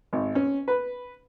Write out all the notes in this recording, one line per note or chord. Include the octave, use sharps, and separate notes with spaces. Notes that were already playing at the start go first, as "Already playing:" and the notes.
G#1
C#4
B4